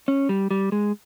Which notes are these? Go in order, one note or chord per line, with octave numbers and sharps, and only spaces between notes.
C#4
G3
G3
G#3